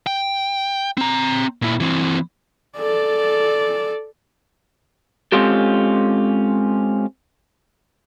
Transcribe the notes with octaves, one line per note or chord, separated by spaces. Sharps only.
G5
C4 A#5
A#2 E4
E3 C4
A4 D5
G#3 C4 C#4 F4 G4 A4